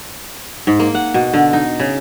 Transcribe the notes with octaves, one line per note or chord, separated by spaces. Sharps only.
G#2
A#3
F#5
B2
D3
D#4
C#3